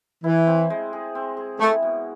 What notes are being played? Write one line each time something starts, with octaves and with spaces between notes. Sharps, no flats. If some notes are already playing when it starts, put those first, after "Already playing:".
E3 E4
C4
G#3
G#4
C4
G#4
A3 E4
B2